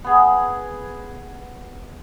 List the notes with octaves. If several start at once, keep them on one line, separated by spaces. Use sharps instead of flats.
B3 G#4